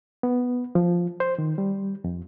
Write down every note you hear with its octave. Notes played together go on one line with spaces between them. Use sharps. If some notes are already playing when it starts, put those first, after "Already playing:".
B3
F3
C5
D#3
G3
F2